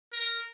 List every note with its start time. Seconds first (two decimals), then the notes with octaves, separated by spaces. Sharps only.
0.13 A#4